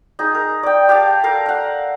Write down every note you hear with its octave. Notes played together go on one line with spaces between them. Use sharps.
D#4 G#4
A#4
D5 G5
G4 F5 G5 A5
A4 A#4 F5
F5 F#5